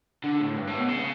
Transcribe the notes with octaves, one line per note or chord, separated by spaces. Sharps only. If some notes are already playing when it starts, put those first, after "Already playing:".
D3
A2
G2
A2
B2
C#3